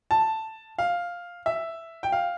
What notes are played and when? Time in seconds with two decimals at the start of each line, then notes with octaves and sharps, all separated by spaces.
0.11 A5
0.79 F5
1.46 E5
2.03 G5
2.12 F5